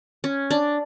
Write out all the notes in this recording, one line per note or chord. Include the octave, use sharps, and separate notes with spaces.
C#4
D4